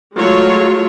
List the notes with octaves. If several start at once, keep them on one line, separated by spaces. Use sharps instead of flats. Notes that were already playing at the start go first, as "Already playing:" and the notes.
F#3 G#3 A3 F4 C#5